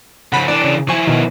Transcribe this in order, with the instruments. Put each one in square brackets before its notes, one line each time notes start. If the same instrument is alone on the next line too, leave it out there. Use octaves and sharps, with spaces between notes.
[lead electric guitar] C#3 F3 [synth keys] F#5 B5
[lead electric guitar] E3 D4 [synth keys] D5
[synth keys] C#3
[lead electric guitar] F3 E4 [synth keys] G#5 C#6
[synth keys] B2 D#3